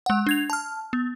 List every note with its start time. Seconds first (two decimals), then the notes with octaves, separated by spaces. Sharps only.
0.06 G#3 F#5
0.27 D4 G#6 F7
0.50 A5 F6
0.93 B3